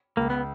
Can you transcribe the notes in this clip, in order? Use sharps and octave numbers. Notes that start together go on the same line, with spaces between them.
C#2 A#3
B3